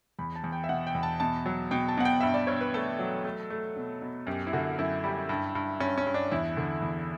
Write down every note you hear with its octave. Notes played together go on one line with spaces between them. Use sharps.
E2 B5
A5
E2
G5
E5
B2 F#5
G5
E2
A5
B2 A5
F#3
B2 G5
A5
B2 F#5
G5
G2 E5
D5
G2 C#5
B4
A3 A4
F#3
A3
A3
B2
B2
F#2 G4
E4
D3 F#4
F#2 E4
G3
G2
G2
G2 C#4
C#4
G2
D4
E2 E4
D3
E2